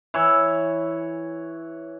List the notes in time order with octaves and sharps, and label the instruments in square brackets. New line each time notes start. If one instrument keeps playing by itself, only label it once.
[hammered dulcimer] E3 C#5